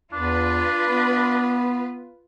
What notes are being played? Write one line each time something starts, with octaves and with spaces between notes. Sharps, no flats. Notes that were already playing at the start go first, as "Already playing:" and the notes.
E2 D4 F4 B4
B3